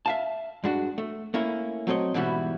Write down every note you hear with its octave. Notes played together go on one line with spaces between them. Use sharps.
E5 F5 A5
G2 G#3 D4 F#4
A3
A3 A#3 C#4 E4
F#3 A3 C4 C#5 D#5
G#2 B2 E3 G3 E4 F#4